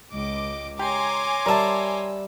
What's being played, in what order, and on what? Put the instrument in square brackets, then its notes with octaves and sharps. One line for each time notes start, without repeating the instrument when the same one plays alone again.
[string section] C#2 D6 [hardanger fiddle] D#5
[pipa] G4 [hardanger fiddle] C#5 D6 [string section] G#5 A#5 C6
[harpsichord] G3 E5 [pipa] A#4 A5